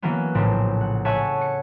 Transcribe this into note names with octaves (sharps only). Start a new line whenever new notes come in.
E3 F#3 A#3 B3 C#4
A#1 A2 C#3 C4 D4
F#5
C#5 E5 F#5 G#5 A5 C#6
C#7